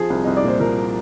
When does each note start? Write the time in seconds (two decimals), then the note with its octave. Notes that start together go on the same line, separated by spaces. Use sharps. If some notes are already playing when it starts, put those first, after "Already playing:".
Already playing: F3 G#4
0.10 C2
0.24 C2 D#5
0.37 D5
0.44 A#2 C5
0.60 F3 A#4